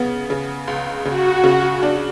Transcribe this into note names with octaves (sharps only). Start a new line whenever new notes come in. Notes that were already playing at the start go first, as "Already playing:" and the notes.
Already playing: C#3 B3
C#3
C#2
C#3 F#4
C#3
D4